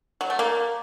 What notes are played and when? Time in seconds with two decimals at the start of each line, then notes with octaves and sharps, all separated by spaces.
0.21 F#3
0.30 A3
0.39 A#3